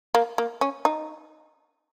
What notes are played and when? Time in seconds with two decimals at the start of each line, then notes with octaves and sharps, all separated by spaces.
0.15 A#3
0.38 A#3
0.61 C#4
0.85 D#4